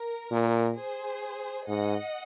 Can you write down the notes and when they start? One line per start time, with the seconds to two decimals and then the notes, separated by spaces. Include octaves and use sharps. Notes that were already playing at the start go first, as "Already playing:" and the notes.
Already playing: A#4
0.31 A#2
0.77 G#4 C5
1.68 G#2 D#5 F#5